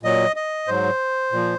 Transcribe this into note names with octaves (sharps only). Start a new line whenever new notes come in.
A#2 F#3 D#5
D#5
G#2 F#3 C5
A#2 F3